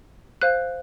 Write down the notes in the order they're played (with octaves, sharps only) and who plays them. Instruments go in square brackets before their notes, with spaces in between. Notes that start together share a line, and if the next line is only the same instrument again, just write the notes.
[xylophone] C5 F5 F#6